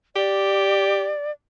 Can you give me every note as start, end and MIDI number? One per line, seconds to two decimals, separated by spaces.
0.16 1.12 67
0.16 1.31 74